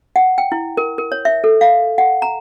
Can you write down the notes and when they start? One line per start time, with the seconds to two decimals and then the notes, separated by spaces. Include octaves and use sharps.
0.16 F#5
0.38 G5
0.52 E4
0.77 A#4
0.98 A#4
1.12 C#5
1.25 E5
1.44 A4
1.61 F5
1.98 F#5
2.22 A#5